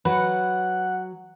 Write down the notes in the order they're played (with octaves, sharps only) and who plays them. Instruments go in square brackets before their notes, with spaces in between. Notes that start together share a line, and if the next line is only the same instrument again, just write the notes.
[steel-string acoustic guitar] F#3 [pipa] B4 [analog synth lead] F#5